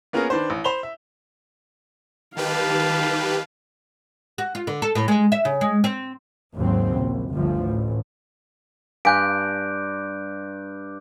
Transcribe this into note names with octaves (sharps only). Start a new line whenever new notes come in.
A#3 B3 C#4 F4 G#4 A#4
D#3 D4 B4 C5
A1
C5 B5 F7 G7
E5
D#3 G4 B4 F5 A5
F#4
F4
D3
A4
A2
G#3
E5
C#3
G#3
C4
G#1 D#2 C#3 F#3 C4
A#1
G1 D2 F3
A1
G2 F5 G#5 F#6 G6 D7